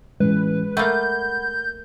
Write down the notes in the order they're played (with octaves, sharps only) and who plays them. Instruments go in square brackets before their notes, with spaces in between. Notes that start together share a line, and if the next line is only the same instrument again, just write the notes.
[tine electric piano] A2 E3 C#4 [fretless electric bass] G#3 [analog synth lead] B4
[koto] A3 A#3 [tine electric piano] F#5 B5 [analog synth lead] G6